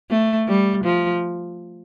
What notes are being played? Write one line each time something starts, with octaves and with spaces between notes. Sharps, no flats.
A3
G3
F3